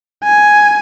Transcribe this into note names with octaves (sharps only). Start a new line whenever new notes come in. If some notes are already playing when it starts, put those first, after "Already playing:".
G#5